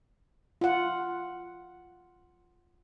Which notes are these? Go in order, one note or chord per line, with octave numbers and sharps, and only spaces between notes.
F4 F#5